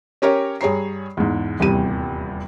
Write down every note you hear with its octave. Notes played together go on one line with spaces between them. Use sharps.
C#4 G4 A#4 C#5
G2 G#4 C#5 A#5 C7
E2 G#2
D#1 E2 G2 C3 D#7